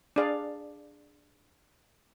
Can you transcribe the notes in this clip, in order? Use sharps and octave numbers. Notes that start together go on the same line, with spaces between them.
D4 G#4 D5 F5